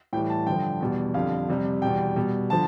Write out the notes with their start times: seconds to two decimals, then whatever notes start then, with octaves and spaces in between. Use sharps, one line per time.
0.13 A2 E3 G3 G5
0.30 A5
0.47 G2 D3 F3 G5
0.80 E2 B2 G3
1.14 F2 D3 G3 F5
1.48 F2 C3 G3
1.82 E2 B2 G3 G5
2.16 B2 G3
2.50 D3 F3 A5